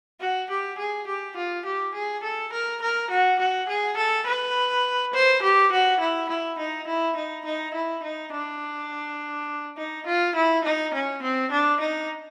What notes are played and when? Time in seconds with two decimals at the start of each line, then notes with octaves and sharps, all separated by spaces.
0.20 F#4
0.50 G4
0.78 G#4
1.07 G4
1.37 F4
1.65 G4
1.94 G#4
2.23 A4
2.52 A#4
2.82 A#4
3.11 F#4
3.39 F#4
3.69 G#4
3.97 A4
4.26 B4
5.14 C5
5.42 G4
5.72 F#4
6.00 E4
6.29 E4
6.59 D#4
6.87 E4
7.16 D#4
7.45 D#4
7.74 E4
8.03 D#4
8.32 D4
9.77 D#4
10.06 F4
10.35 E4
10.64 D#4
10.94 C#4
11.23 C4
11.51 D4
11.80 D#4